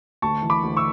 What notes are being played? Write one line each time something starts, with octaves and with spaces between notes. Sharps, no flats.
D2 A5 C#6
E3
B5 D6
D2
C#6 E6